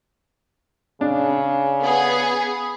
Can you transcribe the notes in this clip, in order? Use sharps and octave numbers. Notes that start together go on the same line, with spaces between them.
C#3 D4
B3 G#4